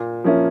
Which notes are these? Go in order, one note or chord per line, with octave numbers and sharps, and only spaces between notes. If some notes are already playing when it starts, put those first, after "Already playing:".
Already playing: A#2
F3 A#3 C#4 E4